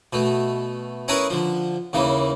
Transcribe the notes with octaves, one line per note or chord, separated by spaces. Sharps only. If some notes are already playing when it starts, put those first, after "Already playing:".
B2 A3
C#4 E4 G#4 A#4 B4 C#5
D3 F3
D#2 C#3 E3 A#3